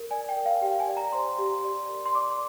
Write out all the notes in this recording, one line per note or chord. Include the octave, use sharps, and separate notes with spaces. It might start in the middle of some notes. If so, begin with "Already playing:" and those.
Already playing: A#4
D5 G#5
G5
A#4
F5
G4 G5
G#5
D5
A#5
C5 C6
G4
D5
A#4
C6
D5 D6